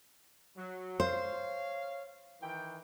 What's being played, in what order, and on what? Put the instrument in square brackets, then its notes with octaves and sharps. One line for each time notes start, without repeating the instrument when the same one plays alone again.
[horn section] F#3
[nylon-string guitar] C5 [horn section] C#5 F5
[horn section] D#3 E3 G5